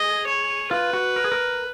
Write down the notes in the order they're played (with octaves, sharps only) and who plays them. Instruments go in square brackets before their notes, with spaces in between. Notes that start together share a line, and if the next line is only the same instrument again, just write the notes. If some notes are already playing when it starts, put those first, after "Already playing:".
Already playing: [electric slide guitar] G#4 [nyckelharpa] D#5
[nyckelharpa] C#5
[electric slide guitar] F4 [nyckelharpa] B4
[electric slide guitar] F#4
A#4
G#4
A#4